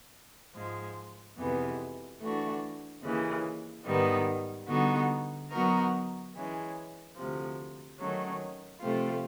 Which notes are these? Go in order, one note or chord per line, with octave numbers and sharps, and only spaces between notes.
G#2 F3 G#3
F2 C3 E3 G#3 B3
E3 A3 D4 F#4
D#2 C#3 E3
G#2 D#3 G3 B3 D#4
D3 G3 B3 D#4 F#4
F#3 B3 D#4 F#4 A#4
E3 G#3 C#4
D2 C3 F3
D#3 F#3 A3 C#4
C3 F3 A3 C4 F4